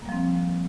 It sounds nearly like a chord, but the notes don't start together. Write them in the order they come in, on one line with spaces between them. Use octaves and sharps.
A#3 G3 F3 C4